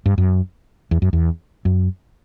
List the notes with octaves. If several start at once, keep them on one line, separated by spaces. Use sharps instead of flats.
G2
F#2
E2
F#2
E2
F#2